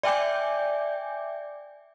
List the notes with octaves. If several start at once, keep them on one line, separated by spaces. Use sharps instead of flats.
D5 E5 G5 G#5 D6 G6